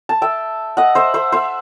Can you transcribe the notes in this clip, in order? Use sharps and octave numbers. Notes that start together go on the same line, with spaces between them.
A5
E5 G5
D#5 F#5
C5 E5
C5 E5
C5 E5